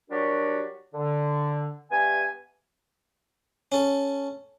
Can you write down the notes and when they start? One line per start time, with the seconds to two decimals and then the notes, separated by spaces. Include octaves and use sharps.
0.10 F#3 G3 D4 F#4 G4 A#4
0.94 D3
1.91 G2 B3 E5 G#5
3.72 C#4 A4